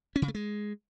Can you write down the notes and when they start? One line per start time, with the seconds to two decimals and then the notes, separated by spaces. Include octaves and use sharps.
0.16 C#4
0.22 C#3
0.28 A3
0.35 G#3